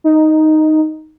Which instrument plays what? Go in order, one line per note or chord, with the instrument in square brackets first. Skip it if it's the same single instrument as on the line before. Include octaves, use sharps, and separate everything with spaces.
[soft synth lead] D#4